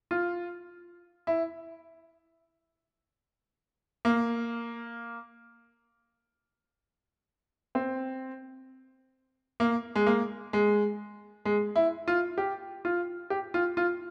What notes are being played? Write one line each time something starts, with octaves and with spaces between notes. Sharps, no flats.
F4
E4
A#3
C4
A#3
G#3
A#3
G#3
G#3
E4
F4
G4
F4
G4
F4
F4